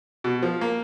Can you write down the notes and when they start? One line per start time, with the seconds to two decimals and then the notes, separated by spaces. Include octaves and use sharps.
0.24 B2
0.42 F3
0.61 A#3